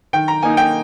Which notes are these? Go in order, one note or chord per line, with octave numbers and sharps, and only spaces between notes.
D#3 G5
A#5
A#3 D#4 G#5
G5